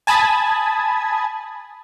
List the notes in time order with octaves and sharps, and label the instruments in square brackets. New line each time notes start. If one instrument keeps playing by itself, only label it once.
[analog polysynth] G#5 A5 B5 D#6 G#6